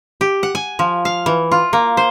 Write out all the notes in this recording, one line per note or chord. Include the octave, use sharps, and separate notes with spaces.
G4
F#5
G#5
F3
F5
E3
F4
A#3
C5